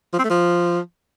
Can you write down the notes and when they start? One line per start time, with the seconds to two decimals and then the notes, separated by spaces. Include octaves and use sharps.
0.13 F3
0.19 C4
0.24 A3
0.30 F3